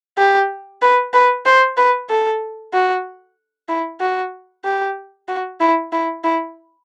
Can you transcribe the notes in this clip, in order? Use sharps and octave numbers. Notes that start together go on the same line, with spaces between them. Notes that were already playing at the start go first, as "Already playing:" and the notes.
G4
B4
B4
C5
B4
A4
F#4
E4
F#4
G4
F#4
E4
E4
E4